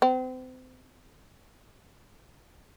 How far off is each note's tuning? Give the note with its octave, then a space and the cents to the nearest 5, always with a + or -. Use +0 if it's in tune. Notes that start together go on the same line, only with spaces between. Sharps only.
C4 -35